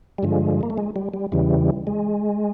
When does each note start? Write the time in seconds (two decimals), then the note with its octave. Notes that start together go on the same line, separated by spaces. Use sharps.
0.18 G3
0.23 G2 D3 F3 G#3
0.63 A#3
0.70 A3
0.78 G#3
0.96 G3
1.14 G3
1.32 E2 C#3 E3 G3
1.87 G#3